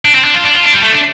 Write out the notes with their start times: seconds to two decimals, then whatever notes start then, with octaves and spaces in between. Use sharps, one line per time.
0.05 D4
0.15 C4
0.24 D4
0.34 F4
0.44 D4
0.54 F4
0.63 D4
0.74 G3
0.83 A3
0.92 D4